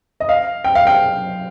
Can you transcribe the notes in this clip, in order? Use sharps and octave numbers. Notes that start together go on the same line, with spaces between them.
D#5
F5
G5
F5
G5